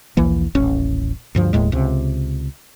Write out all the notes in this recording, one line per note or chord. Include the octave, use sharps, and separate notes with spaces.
A#1 D#2 E3 A#3
D#1 A1 C#4
D2 G2 F3
E1 D#2 A2 G#3
C#2 C3